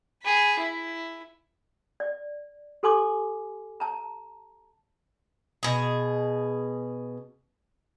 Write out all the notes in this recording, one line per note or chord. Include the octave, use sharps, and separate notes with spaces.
G#4 B5
E4
D5
G4 A4 G#5 C6 D6
A5 A#5
B2 G#4